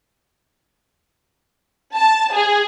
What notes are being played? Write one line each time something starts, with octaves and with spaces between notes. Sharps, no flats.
A5
G#4